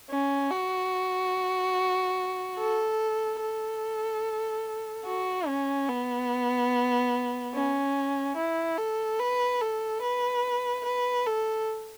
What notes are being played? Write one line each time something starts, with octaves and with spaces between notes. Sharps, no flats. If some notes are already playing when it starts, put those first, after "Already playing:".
C#4
F#4
A4
A4
F#4
C#4
B3
C#4
E4
A4
B4
A4
B4
B4
A4